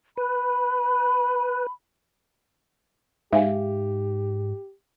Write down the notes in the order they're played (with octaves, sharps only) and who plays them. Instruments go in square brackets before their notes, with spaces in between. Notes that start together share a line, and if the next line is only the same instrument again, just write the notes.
[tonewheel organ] B4 [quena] B5
[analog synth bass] G#2 [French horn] G4 [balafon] E5 F5 G#5